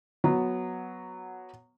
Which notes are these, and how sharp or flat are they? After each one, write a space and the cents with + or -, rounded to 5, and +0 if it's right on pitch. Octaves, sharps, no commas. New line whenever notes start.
F#3 -5 B3 +0